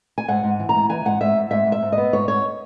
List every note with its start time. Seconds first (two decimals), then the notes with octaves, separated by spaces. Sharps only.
0.18 G#5
0.28 G#2 F#5
0.44 G#2
0.59 E3
0.69 A#5
0.75 G#2
0.89 E3 G#5
1.05 G#2 F#5
1.21 G#2 E5
1.36 G#2
1.51 G#2 E5
1.66 G#2
1.72 E5
1.82 G#2
1.92 D#5
1.98 B3
2.13 G#2 C#5
2.28 G#2 C#5